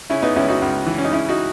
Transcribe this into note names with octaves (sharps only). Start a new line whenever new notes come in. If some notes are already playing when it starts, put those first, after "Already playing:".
C#3 C#4 E4
B3 D#4
C#2 C#4 E4
D#4 F#4
C#2
E3
C#4
D#4
C#3 C#4 E4
D#4 F#4